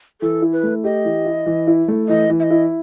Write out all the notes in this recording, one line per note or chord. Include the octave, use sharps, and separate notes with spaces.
E3 A4
E4
B4
A3
G4 D#5
E3
E4
E3
E4
A3
E3 D#5
E3
E5
D#5
E4